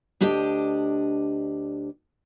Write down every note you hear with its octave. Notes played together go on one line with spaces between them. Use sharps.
D2 D4 G4 D5 D#5